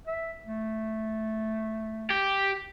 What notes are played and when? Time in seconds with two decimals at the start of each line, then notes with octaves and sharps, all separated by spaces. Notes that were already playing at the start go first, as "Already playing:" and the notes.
0.07 E5
0.46 A3
2.10 G4